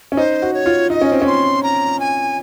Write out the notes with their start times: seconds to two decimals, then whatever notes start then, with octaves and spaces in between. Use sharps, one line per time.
0.12 C#4
0.17 D#4 C5
0.42 F#4
0.54 C#5
0.66 F4
0.90 D#4 D#5
1.01 C#4
1.12 C4
1.22 C#4
1.27 C6
1.63 A#5
2.00 G#5